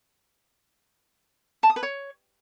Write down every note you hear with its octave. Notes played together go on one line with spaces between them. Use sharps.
A5
D#6
B4
C#5